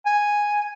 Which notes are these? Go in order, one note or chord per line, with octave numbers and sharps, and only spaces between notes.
G#5